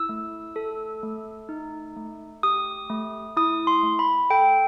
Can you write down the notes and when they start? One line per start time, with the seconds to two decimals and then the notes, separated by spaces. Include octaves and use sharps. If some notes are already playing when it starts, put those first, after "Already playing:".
Already playing: E4 E6
0.09 A3
0.56 A4
1.03 A3
1.49 D#4
1.96 A3
2.43 G4 D#6
2.90 A3
3.36 E4 D#6
3.67 C6
3.83 A3
3.99 B5
4.30 A4 G5